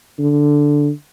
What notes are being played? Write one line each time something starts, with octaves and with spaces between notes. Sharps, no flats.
D3